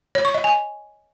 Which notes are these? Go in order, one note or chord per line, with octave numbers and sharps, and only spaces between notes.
C#5
C#6
D#5
G#5